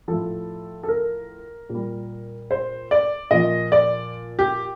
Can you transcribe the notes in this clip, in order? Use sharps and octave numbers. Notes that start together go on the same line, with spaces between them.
A2 F3 A4
A4
A#4
A#2 G3
C5
D5
A#2 F3 D#5
D5
G4